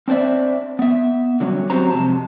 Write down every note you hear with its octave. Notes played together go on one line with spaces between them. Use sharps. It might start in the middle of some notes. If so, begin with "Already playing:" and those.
C4 D4 C5 D5 E5
B3 E5
D3 F#3 G3 C#4
F#3 C4 F#4 G4 C5 A#5
F2 C3 G#3 A5